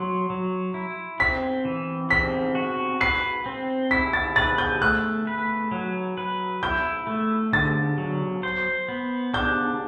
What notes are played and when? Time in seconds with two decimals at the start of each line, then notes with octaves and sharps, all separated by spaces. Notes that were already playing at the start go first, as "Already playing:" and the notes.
Already playing: F#3 C6
0.30 F#3
0.74 E4
1.20 C4 B6
1.65 E3
2.10 C4 B6
2.55 F#4
3.01 B4 C7
3.46 C4
3.91 E4 B6
4.13 A6
4.36 B4 A6
4.58 G6
4.81 A3 F#6
5.27 B4
5.71 F#3
6.17 B4
6.63 E4 G6
7.07 A3
7.53 D3 A6
7.98 F#3
8.43 C5
8.88 B3
9.34 D4 G6